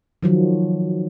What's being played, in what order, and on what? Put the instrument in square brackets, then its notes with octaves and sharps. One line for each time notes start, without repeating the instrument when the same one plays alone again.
[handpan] D#3 F3 F#3